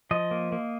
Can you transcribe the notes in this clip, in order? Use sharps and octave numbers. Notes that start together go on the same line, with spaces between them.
F3 D#5
A#3
A#3